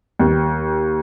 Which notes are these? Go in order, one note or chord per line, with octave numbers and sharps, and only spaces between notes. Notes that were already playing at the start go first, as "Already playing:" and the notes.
D#2